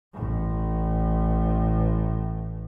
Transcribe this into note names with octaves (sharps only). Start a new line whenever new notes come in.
A1 A2